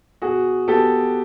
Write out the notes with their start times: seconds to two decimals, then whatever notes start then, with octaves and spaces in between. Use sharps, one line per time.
0.22 B2 F#4 G#4
0.68 B3 G4 A4